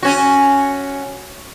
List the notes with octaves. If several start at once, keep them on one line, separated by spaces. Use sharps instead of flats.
C#4 F#4